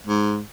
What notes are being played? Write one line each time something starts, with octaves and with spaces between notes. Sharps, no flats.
G#2